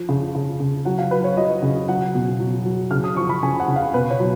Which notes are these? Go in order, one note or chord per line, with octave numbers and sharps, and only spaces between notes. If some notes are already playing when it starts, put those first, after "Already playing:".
Already playing: F3
C#3
C#3
C#3
F#3 F#5
F5
F#3 B4
C#5
F#3 D#5
C#3
F#3 F#5
B2
F#3
F#3
C#3 F6
D#6
F3 C#6
B5
C#3 G#5
F#5
C#3
F5
B2 B4
C#5
F#3